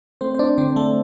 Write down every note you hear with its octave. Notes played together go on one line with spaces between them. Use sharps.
A3 C4 C5
C5
D4 D5
D3 C4 C5
A3 A4